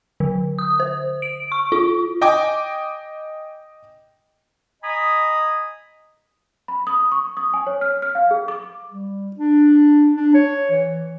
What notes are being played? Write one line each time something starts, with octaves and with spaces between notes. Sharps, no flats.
D3
D#6
C5
D7
C#6
F4
D#5 G5 G#5 D6
D#5 G#5 A#5 B5 D#6
B5
D#6
C#6
D#6
G#5
C#5
F6
F6
F5
G#4
D6
G3
D4
D4
C#5
E3